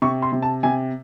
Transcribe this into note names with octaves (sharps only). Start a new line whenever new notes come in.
C3 C#6
C6
C3
A5
C3 G#5